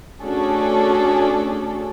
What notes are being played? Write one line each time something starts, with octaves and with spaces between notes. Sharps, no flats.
A3 C#4 D4 F#4 G#4 A4